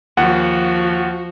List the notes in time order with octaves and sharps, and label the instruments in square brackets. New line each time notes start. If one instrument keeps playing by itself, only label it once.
[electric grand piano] D#2 F#5 [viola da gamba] F3 F#4